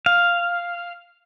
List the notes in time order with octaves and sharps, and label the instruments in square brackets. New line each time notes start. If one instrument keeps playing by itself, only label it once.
[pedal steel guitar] F5